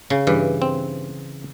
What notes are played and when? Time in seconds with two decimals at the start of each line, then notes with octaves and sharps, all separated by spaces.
0.10 C#3
0.27 G2 E3
0.62 C4